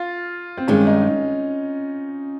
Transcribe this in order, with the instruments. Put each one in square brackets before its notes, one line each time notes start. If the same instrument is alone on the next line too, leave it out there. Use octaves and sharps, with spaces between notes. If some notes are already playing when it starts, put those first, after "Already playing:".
Already playing: [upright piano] F4
C4
[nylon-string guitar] G2 D#3 G#3 [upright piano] C#4
[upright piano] D#4